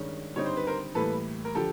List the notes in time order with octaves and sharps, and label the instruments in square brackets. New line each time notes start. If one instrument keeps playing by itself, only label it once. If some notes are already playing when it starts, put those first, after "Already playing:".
Already playing: [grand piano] G2 D#3 G#3 C#4
[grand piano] D3 G3 C4 D#4 [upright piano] C#5
[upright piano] C5
B4
A#4 C5
[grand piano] A2 E3 G3 A#3 [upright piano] A4 B4
[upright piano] A#4
[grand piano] D3 F3 [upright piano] G4 A4